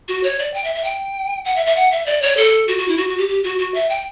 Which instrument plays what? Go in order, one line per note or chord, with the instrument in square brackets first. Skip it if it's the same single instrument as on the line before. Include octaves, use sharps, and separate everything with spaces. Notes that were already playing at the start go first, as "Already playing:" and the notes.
[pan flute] F#4
C#5
D5
G5
E5
E5
G5
F#5
E5
E5
F#5
E5
D5
C#5
A4
F#4
F#4
E4
F#4
F#4
G4
G4
F#4
F#4
E5
G5